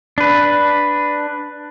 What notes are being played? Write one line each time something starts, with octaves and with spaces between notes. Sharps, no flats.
D4 B4